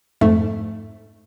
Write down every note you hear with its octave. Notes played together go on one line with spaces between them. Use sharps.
F2 G#2 A3